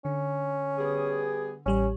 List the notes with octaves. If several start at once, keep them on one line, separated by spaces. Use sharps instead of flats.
D3 C#4
G3 B3 G#4
A1 G3 C#4 C#5